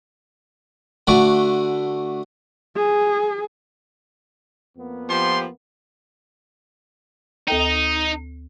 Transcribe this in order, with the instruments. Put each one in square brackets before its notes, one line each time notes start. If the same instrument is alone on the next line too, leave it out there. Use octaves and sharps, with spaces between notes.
[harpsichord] D3 A3 F#4 D5
[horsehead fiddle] G#4
[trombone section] F2 A#3 B3
[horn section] F3 G4 [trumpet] C6
[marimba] D2 A4 G5 [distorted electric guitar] D#4